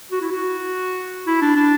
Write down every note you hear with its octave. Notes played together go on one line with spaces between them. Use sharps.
F#4
E4
F#4
E4
D4
D4